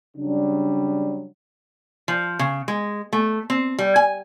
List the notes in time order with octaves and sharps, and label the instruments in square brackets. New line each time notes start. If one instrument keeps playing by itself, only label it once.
[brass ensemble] C#3 F#3 G3 D4
[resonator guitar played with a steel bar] F3
C#3
G#3
A3
C4
G3
G#5